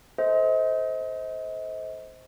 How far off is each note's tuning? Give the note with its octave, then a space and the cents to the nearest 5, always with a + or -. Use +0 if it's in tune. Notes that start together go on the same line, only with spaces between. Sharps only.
A4 +0 C5 +0 D#5 +35